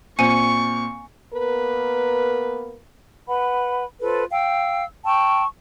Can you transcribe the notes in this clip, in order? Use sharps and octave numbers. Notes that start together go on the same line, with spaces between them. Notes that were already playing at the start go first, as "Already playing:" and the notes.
A#2 C4 G#5 C#6 C#7 D#7
A#3 B3 A#4 B4
B4 F#5 B5
F4 A4 B4 C5
F5 G5 E6
G5 A5 C#6 E6